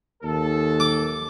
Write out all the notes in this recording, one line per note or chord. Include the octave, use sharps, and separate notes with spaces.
D#2 A4
D6